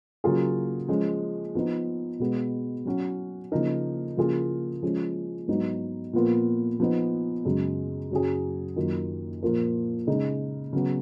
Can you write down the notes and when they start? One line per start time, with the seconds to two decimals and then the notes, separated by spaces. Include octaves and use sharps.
0.24 C#3 F#3 A#3 F4 G#4
0.88 F3 G#3 C#4
1.55 F3 B3 D#4
2.20 B2 G#3 B3
2.85 F#3 C#4 F#4
3.52 C#3 F3 A#3 D#4 A#4
4.17 C#3 F3 A#3 F4 G#4
4.83 F3 G#3 C#4
5.48 G#2 F#3 B3 D#4
6.13 A#2 F3 B3 F4 A#4
6.80 F3 B3 D#4
7.45 F#2 C#3 G#3
8.11 F#2 C#3 F#3 C#4 G#4
8.76 F#2 D#3 A#3 F4
9.43 A#2 F3 A#3 F4 A#4
10.07 C#3 G#3 D#4
10.73 C#3 F#3 B3 F#4